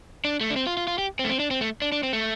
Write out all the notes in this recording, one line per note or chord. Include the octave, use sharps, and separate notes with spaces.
D4
A3
D4
C4
F4
F4
F4
G4
C4
A3
C4
D4
C4
A3
D4
D4
C4
A3